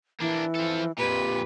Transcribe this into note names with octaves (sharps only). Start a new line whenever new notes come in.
E3 A#3 D4
F3 A4
F2 A#2 G4 B4